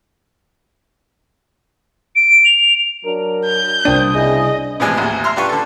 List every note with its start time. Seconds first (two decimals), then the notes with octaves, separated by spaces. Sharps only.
2.15 D7
2.44 F7
3.06 F#3 D4 A#4
3.45 G6
3.85 C2 A#2 C4 D4 D#6
4.15 C#3 E4 G#4 D#5
4.80 A2 C3 E3 F3 G#3 G#5
4.97 A1 D#2
5.24 E5 A#5 C6 F6
5.36 D4 F4 G4 B4 C#6
5.49 D3 A4